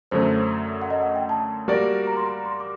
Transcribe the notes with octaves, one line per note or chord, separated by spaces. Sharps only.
F#2 D3 F#3 A3 C5
F#5
D#5
F#5
G5
A5
G3 A#3 F#4 A#4 D5
A#5
C6
A#5
C6
D6